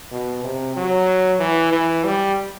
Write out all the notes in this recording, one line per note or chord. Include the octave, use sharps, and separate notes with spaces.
B2
C3
F#3
E3
E3
G3